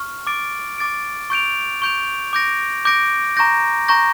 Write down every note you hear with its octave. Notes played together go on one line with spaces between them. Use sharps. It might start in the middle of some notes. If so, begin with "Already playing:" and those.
Already playing: C#6 F6
D6 A6 D7
D6 A6 D7
C#6 G6 D7 F7
C#6 G6 D7 F7
D6 G6 A#6 D7
D6 G6 A#6 D7
A#5 C#6 G6 A#6
A#5 C#6 G6 A#6